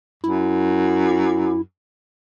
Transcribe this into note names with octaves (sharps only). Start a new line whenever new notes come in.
F#2 E4